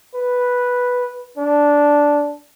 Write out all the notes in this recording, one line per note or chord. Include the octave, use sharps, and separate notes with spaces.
B4
D4